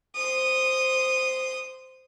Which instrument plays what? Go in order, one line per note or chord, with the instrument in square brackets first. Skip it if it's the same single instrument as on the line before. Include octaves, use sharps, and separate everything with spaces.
[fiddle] C5 D#6